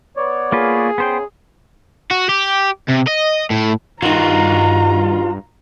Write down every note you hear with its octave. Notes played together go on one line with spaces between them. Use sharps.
B3 C#5 D5
A#3 F4 G#4 B4
C#3 B3 C5 G5
F#4
G4
C3
D#5
A2
G2 D#3 D#4 F4 F#4 A#5